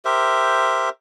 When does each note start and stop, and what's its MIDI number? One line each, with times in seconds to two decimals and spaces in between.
0.05 0.89 67
0.05 0.89 70
0.05 0.89 72
0.05 0.89 76